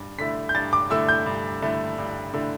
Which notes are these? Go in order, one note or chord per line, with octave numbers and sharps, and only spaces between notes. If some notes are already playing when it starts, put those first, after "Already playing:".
Already playing: G2
D3 A3 E4 B6
G6
G2 A6
D6
D3 A3 E4 E6
G6
G2
D3 A3 E4
G2
D3 A3 E4